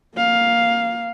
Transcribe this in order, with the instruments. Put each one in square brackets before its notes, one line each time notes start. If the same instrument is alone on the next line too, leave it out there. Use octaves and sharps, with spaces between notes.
[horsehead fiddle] A#3 F5